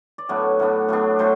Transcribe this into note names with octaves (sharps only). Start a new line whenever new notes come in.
D5
A2 F#3 B3 D4 C#5
A2 F#3 B3 D4
A2 F#3 B3 D4
A2 F#3 C5